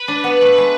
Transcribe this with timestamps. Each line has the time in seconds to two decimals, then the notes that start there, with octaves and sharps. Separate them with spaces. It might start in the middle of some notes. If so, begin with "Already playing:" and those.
Already playing: B4
0.08 D4
0.24 B3
0.41 A3
0.58 G#3